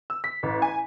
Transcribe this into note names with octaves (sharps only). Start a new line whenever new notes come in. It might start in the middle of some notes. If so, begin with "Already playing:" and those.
E6
B6
A1
G#5